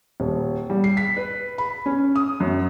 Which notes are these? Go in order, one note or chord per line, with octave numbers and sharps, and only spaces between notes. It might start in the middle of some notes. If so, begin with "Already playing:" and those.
D#1
G3
C7
B6
B4
B5
C#4
D#6
F#2